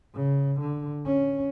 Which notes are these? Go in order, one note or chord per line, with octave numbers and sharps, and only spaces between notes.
C#3
D3
C#4